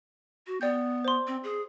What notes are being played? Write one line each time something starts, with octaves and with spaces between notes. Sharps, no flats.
F#4
B3 D5 G5 G6
C5 C6
C4
G#4